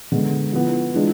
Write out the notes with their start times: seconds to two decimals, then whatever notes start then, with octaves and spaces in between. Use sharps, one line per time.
0.12 D3 G#3 B3
0.53 F3 B3 E4
0.94 E3 G#3 D4 F4